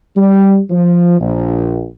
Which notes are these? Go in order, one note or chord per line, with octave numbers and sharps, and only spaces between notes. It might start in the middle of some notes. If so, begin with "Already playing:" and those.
G3
F3
A#1